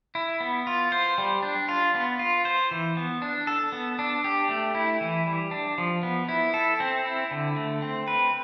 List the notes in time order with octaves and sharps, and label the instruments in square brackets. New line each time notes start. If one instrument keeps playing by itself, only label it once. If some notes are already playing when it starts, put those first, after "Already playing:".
[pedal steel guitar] E4
B3
F4
C5
G3
D4
F4
B3
F4
C5
E3
B3
D4
A4
B3
D4
G4
A3
E4
E3
G3
D4
F3
B3
E4
A4
C4
E4
D3
A3
C4
B4